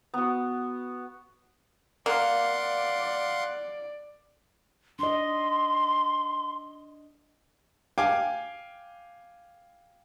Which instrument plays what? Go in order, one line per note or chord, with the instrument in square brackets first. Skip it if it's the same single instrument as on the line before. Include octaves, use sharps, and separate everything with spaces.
[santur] B3 F#4
[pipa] A#3 [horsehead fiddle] D5 [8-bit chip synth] F5 F#5 C6
[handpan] D4 D#5 [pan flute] C6
[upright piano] F5 G5 G#5 D6